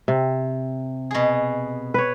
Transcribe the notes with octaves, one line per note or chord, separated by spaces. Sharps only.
C3
B2 G#4
B4 C#5